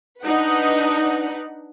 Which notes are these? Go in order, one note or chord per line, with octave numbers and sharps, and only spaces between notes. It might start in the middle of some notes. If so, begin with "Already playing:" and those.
D4 D#4 B4 F#5